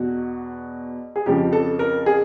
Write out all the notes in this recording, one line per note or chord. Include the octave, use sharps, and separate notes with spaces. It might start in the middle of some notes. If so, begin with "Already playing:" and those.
Already playing: E2 B2 F#4
G#4
F2 C#3 F3 G4
A4
A#4
G#4